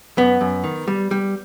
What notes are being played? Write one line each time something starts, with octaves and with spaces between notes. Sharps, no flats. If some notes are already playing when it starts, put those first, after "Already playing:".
F#2 B3
F#2
D#3
G3
G3